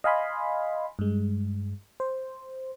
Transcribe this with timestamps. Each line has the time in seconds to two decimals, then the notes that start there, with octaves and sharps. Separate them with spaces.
0.04 D#5 F5 G#5 B5 C6
0.99 G2 G#3
2.00 C5